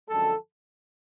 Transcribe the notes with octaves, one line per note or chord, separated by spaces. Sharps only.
F#2 D3 F3 G#3 A4